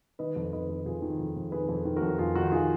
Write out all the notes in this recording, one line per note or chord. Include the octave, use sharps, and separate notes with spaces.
D#3 B4 D#5
F2
D#3 B4 D#5
F2
F2 F4 G#4
D#3
F2
F2
D#3 G#4 B4
F2
D#3
F#4 A#4
F2
F2 F4 G#4
D#3 D#4 F#4
D#3 F4 G#4